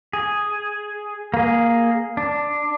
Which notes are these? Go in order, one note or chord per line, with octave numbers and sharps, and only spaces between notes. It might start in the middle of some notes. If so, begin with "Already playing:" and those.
G#4
A#3 G#4
D4